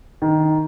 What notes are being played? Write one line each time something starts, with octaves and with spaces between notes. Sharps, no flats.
D#3